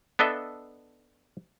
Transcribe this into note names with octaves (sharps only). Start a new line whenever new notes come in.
B3 D4 A4 D#5 E5